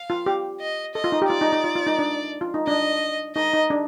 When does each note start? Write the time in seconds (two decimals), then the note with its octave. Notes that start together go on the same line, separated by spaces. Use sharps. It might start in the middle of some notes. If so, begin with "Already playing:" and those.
Already playing: F5
0.10 F4
0.26 G4
0.61 D#5
0.95 A4 D#5
1.04 F4
1.12 D#4
1.22 G4
1.29 F4 D5
1.41 D#4
1.53 D#4
1.64 F4
1.75 F4
1.87 D#4
1.99 D4
2.41 F4
2.54 D#4
2.67 D4 D#5
3.35 D#4 D#5
3.54 D#4
3.70 D4